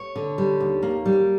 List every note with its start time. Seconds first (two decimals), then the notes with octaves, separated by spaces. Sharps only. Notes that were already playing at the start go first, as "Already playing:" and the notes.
Already playing: C#5
0.16 D3
0.38 G3
0.60 D#2
0.83 A#3
1.06 G3